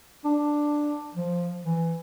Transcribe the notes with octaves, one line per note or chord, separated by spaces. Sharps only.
D4
F3
E3